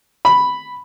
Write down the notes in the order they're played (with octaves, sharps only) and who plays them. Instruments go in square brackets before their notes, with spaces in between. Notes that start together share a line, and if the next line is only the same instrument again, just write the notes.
[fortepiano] B5